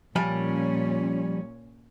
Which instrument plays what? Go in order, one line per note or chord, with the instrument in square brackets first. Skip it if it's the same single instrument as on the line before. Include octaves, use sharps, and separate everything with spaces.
[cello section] A#2 C#4 [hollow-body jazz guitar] F3 G3 G#5